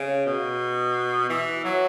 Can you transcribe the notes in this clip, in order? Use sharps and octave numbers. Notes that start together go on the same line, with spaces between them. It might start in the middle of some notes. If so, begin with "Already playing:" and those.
Already playing: C#3
B2
E3
F#3